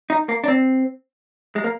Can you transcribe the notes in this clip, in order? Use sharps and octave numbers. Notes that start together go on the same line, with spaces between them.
D#4
A#3
D4
C4
G#3
A#3